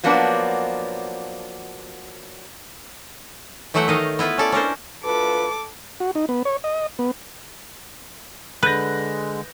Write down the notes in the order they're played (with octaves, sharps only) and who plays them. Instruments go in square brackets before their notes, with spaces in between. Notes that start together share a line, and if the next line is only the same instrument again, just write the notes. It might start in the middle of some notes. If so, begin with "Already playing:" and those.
[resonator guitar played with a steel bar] F3 F#3 A#3 B3 D4
[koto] E3 F#3 A3 E5 F#5 G5
D#3 D#5 F5
B3 E4 F4 B4
C#4 A4 D5
C#4 D4 A#4 C5
[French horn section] D2 F4 B4 [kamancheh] A4 D6
[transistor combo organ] F#4
D#4
B3
C#5
D#5
B3
[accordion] D3 G#3 [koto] B4 [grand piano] F#6 G6 A#6